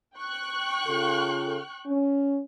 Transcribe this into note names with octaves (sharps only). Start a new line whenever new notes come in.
G5 C#6 F#6
C#3 F4 A4
C#4